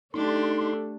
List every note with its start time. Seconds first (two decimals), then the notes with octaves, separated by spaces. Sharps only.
0.14 A3 D4 D#4 G4 A4 C6